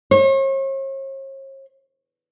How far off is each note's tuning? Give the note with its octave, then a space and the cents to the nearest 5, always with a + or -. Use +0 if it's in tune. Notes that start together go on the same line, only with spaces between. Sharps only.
C#5 -45